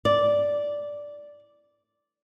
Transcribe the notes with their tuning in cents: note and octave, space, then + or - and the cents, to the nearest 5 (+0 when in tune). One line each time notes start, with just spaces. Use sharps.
D5 -5